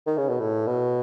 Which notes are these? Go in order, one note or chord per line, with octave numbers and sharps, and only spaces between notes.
D#3
C#3
B2
A2
B2